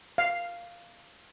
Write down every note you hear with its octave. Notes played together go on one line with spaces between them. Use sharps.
F5